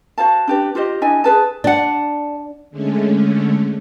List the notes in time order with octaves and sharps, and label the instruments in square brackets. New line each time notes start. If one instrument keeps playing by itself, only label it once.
[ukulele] F#4 C5 F5 A5
D4 G4 B4
F4 G4 C5 D#5
D4 E4 D#5 G#5
G#4 B4 A5
[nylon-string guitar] D4 [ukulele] D5 F#5
[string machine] D3 G#3 A3 C#4